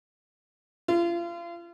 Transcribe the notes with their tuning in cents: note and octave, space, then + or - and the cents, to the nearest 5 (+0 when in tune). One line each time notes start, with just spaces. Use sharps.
F4 -35